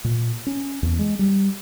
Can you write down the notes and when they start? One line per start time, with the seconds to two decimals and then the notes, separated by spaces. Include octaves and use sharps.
0.04 A#2
0.47 C#4
0.82 E2
0.99 G#3
1.19 G3